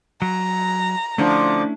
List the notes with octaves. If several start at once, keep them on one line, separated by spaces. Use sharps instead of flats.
F#3 A#5
D3 F3 A3 C#4 D4 E4